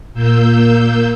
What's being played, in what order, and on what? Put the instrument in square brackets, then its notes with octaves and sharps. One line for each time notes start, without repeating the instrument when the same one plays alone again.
[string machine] A#2 A#3 E6 G6